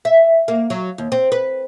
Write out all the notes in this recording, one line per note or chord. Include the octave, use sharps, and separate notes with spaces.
E5
A#3
F#3
D#2
C4
B4